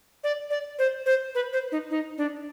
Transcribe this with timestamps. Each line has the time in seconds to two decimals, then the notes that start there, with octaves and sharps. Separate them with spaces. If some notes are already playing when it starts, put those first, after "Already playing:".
0.24 D5
0.50 D5
0.79 C5
1.06 C5
1.35 B4
1.53 C5
1.72 D#4
1.90 D#4
2.18 D4